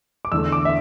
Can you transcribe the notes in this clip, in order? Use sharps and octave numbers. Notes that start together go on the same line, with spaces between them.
D6
E2 D3 A3 E6
D6
E5